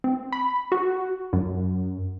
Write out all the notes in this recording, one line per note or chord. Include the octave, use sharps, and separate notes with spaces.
C4
B5
F#4
F#2